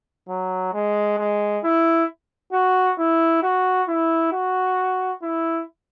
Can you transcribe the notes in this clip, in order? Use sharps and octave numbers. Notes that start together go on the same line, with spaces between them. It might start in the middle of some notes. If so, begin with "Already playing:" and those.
F#3
G#3
G#3
E4
F#4
E4
F#4
E4
F#4
E4